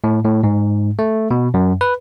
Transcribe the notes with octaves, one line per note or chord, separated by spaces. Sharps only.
A2
A2
G#2
A3
B2
F#2
B4